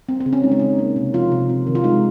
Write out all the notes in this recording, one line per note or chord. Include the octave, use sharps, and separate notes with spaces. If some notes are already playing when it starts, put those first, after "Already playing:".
C4
C4
C#3
C#4
G#3 D#4
C#4
C#3 D#4
A#3
C3
F3 F4
C3
C4
D#3
F4
G#3 D#4